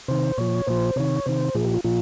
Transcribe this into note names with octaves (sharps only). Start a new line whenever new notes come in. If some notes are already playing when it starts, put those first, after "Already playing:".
C3 D#3 C5
A#2 F3 C#5
A#2 F3 C5
C3 D#3 C#5
C3 D#3 C5
A#2 F3 G#4
G4
F4
A#2 F3 F4